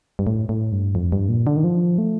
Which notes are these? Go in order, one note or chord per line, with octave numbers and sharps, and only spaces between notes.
G2
A2
A2
G2
F2
G2
A#2
D3
D#3
F3
A3